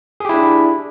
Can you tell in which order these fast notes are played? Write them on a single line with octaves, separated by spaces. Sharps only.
G#4 G4 E4 D4